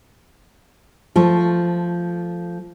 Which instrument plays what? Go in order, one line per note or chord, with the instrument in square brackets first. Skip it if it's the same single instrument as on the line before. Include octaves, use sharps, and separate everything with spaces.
[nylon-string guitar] F3 A3